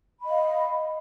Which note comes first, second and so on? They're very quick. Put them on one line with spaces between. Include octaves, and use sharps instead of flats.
B5 D#5 F5